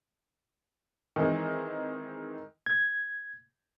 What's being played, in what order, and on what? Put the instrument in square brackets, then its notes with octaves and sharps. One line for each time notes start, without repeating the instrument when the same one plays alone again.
[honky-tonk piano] D#3 E3 G#3 C4
[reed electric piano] G#6